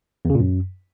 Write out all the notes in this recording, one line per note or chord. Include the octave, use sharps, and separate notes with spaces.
E2
C#3
A#2
F#2